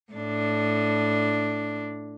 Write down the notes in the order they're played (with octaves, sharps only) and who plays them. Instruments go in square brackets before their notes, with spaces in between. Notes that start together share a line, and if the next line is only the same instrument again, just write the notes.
[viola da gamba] A2 D4